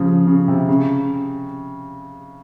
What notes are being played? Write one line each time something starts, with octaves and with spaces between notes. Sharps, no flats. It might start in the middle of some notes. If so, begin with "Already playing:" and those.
Already playing: C#3 F3
C#3
C3
C#3